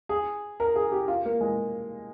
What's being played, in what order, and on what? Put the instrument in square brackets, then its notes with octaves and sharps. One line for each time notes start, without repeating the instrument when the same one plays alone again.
[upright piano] G#4
A#4
G#4
G4
F4
A#3
G#3